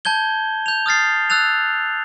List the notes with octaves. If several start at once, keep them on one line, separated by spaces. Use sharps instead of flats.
A5 G6 G#6 G7
G6 F7
D#6 F6 A6 C7
E6 F#6 A6 F7